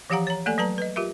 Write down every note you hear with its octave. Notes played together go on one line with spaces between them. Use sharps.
E3 F3 G4 F5 F#5 A#5
C#5 A#5
A3 A#3 A4 D5 G#5
F#3 B4 A5 A#5
B4 D#5
F4 G4 A#4 E5